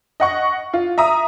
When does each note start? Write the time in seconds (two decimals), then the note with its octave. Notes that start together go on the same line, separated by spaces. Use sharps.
0.20 D#5 F#5 C#6
0.73 F4
0.98 E5 A#5 D#6